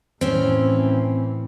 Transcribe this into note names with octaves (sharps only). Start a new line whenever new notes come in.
A2 E3 C4 C#4